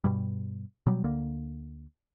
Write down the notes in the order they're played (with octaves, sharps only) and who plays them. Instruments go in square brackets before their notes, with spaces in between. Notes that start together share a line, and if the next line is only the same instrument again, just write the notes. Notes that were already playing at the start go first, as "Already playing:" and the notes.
[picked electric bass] G2 B2 G3
B2 F#3 G3
D2 D3 A#3